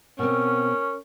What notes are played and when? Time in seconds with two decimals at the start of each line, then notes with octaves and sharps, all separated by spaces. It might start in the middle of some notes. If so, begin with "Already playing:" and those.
0.19 B2 C4 C#4 A#4